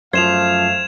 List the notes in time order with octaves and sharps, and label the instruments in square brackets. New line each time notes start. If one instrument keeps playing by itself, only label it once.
[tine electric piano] F#2 F3 [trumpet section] A3 F5 [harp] C5 [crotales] G#6 E7 F7